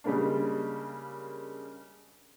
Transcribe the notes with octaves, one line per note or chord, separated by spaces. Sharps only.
C#3 G3 G#3 A#3 D4